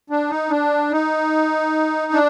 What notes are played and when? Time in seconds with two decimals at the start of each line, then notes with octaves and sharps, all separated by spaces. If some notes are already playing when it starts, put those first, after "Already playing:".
0.10 D4
0.30 D#4
0.50 D4
0.91 D#4
2.13 D4